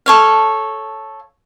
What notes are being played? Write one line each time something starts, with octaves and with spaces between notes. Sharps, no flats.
A4 C#5 F5